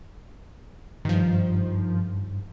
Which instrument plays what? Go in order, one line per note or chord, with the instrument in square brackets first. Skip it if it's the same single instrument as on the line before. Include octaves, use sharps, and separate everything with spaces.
[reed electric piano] G2 [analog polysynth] D#3 F3